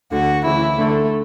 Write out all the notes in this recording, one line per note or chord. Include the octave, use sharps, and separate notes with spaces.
D2 D3 F#4
D2 C#3 E3 E4
D2 D3 A3